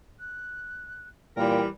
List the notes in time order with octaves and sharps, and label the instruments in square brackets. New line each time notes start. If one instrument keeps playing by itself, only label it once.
[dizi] F#6
[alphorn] A#2 [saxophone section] E3 G3 A#4 [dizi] G5